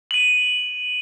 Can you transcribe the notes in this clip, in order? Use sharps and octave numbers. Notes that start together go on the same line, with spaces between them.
D#7 F#7